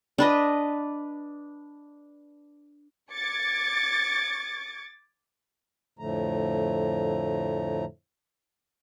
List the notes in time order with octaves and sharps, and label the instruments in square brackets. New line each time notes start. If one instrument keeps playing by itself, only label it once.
[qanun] D4 B4 D#5
[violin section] D6 G#6 A6 C#7
[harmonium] F2 A2 D3 F3 A3 A#5